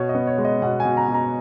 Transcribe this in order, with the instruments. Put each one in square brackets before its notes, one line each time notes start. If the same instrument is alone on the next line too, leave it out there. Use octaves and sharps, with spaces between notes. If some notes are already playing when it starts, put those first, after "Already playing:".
Already playing: [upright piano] B2 C#5
D#5
B3
C#5
G#3
D#5
B2 F#5
G#5
B2
A#5
B2
A#5